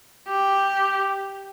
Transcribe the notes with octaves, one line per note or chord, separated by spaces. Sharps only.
G4